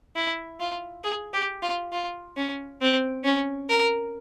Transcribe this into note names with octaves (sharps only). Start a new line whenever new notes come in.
E4
F4
G#4
G4
F4
F4
C#4
C4
C#4
A#4